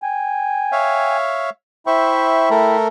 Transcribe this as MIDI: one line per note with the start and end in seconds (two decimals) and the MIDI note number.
0.03 1.17 79
0.03 1.17 80
0.72 1.50 73
0.72 1.50 76
0.72 1.50 77
1.87 2.76 64
1.87 2.49 72
1.87 2.49 76
1.87 2.76 79
1.87 2.76 83
1.87 2.49 85
2.50 2.88 57
2.50 2.88 69
2.50 2.88 70